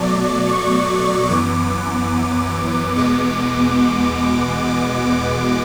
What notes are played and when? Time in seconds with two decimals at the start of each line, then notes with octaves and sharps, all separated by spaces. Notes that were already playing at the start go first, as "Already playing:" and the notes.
Already playing: B2 F#3 A3 D5
0.47 C#6
1.29 F#2 E3 B3 D6
2.95 E2 B2 G#3 B3 D6